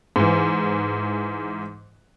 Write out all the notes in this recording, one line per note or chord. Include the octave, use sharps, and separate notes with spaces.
G#2 E3